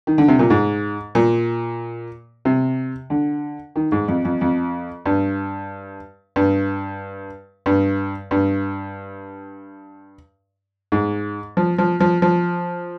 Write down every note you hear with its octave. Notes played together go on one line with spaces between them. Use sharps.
D#3
D3
C3
A#2
G#2
A#2
C3
D3
D#3
G#2
F2
F2
F2
G2
G2
G2
G2
G#2
F3
F3
F3
F3